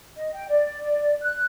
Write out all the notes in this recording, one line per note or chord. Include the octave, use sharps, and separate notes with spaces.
D#5
G5
D5
F#6